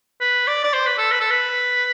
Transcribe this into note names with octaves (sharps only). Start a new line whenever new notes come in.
B4
D5
D5
C5
B4
A4
B4
A4
B4